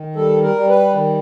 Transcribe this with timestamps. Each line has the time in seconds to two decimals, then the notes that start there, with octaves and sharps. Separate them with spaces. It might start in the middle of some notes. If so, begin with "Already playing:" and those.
Already playing: D#3
0.16 G3 A4
0.42 A#4
0.56 G3
0.69 B4
0.95 D#3